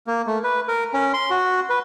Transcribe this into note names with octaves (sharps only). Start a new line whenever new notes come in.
A#3
A3
B4
A#4
C#4
C6
F#4
B4